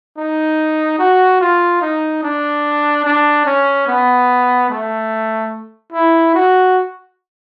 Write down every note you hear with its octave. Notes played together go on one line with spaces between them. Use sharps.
D#4
F#4
F4
D#4
D4
D4
C#4
B3
A3
E4
F#4